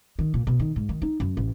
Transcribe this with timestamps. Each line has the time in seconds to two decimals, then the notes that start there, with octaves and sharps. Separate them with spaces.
0.19 D#3
0.34 A#2
0.47 B2
0.60 D#3
0.76 G#2
0.89 D#3
1.02 D#4
1.20 F#2
1.37 A1